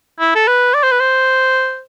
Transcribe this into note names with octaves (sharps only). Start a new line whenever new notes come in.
E4
A4
B4
D5
C5
B4
C5